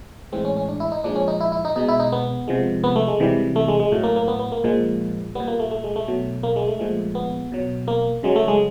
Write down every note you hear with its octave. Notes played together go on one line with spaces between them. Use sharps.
A2 E3 G#3 C4
C#4
C#4
D4
E4
D#4
A#2 F3 G#3 D4
C#4
D#4
E4
E4
D#4
B2 G#3 D#4
E4
D#4
B3
C3 F3 G#3
B3
A3
G#3
C3 E3 G3
A3
G#3
G#3
A2 F#3 A3
A#3
A#3
B3
B3
A#3
A#2 F3 G#3
A#2 G3 B3
A#3
A3
A3
G#3
A3
B2 F#3
A#3
G#3
A3
A#2 F3 G#3
B3
B2 F#3
A#3
C#3 F#3 G#3
A3
G#3